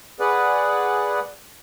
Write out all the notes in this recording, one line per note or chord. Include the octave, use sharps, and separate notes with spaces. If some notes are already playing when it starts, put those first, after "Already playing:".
G#4 B4 D5 F#5